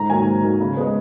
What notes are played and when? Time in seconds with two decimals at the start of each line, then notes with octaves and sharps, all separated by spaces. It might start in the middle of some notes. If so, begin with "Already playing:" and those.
Already playing: G#2 A#5
0.10 D#3 F#3 A#3 G#5
0.27 G#2
0.43 D#3 F#3 A#3
0.60 C#3
0.77 G#3 B3